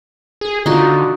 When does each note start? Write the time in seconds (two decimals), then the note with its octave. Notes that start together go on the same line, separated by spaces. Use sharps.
0.41 G#4
0.66 D3 D#4 F4 F#4